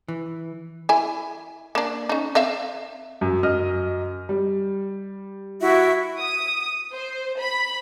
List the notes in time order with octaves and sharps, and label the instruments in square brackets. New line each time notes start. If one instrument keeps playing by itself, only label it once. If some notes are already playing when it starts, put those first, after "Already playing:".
[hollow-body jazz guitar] E3
[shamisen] E4 E5 G#5
A#3 D4
C#4 D#4
C4 E5 F5
[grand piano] F#2
F#2 D#5 F6
G3
[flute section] E4 F#4 E5
[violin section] D#6
C5
B5